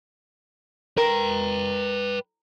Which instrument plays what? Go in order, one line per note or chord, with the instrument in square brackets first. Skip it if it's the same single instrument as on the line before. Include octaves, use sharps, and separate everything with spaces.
[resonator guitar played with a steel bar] A#4 [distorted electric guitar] B4 G5